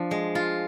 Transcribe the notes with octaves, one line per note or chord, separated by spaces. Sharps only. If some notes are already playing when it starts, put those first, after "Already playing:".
Already playing: F3 D4
G#3
F4